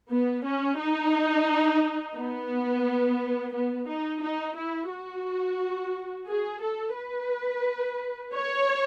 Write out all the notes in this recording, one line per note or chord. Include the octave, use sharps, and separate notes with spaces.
B3
C#4
D#4
B3
B3
D#4
D#4
E4
F#4
G#4
A4
B4
C#5